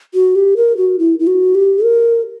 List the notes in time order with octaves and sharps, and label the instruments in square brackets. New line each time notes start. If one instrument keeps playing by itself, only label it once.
[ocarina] F#4
G4
A#4
F#4
E4
E4
F#4
G4
A#4